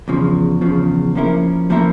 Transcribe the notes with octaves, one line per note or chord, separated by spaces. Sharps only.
E2 C#3 F3
E2 C#3 F3
F3 A#3 C#4 E4 A#4
F3 A#3 C#4 E4 A#4